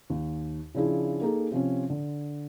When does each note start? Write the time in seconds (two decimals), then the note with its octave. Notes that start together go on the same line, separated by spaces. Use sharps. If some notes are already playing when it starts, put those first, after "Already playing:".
0.10 D#2
0.75 C#3 F3 D4 E4 G#4
1.22 A#3 D#4 G#4 A4
1.51 C3 F3 C4 C#4
1.90 D3